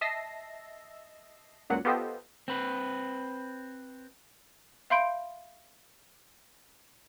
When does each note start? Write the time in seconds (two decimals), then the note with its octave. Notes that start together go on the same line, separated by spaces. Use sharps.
0.01 D#5 E5 A5 E6 A#6 C7
1.70 C#2 F#2 A#2 F#3 F#5
1.85 B3 F4 G4 A4 C5 D#5
2.48 C4 B4
4.90 E5 F5 B5 C6 G6 D7